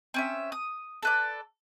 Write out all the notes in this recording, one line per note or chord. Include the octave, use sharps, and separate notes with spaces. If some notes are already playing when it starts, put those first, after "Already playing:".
C4 C#4 E5
D#6
A4 B4 D5